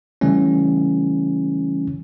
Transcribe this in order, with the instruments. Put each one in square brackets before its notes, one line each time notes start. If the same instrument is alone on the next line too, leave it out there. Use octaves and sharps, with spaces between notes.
[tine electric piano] C#3 E3 G3 A3 C#4